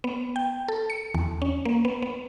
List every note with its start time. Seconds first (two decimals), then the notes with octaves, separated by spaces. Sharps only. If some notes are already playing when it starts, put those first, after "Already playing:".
0.04 B3
0.36 G5
0.68 A4
0.90 C#7
1.14 E2
1.42 C#4
1.65 A#3
1.85 B3
2.02 B3